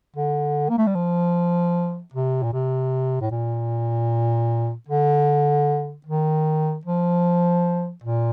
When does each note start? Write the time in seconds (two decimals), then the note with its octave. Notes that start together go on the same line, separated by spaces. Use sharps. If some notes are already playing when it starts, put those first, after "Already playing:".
0.16 D3
0.69 A#3
0.78 A3
0.87 G3
0.95 F3
2.14 C3
2.43 A#2
2.53 C3
3.21 A2
3.31 A#2
4.89 D3
6.06 D#3
6.86 F3
8.04 A#2